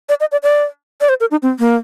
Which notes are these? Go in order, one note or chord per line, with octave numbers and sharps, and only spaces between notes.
D5
D#5
D5
D5
D5
C5
A#4
D#4
C4
A#3